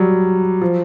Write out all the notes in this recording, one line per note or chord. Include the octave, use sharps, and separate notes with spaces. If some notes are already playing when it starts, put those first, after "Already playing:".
Already playing: F#3 G3
F3